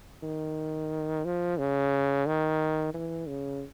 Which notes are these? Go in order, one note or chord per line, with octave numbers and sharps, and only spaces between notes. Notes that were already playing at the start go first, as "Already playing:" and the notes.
D#3
F3
C#3
D#3
E3
C#3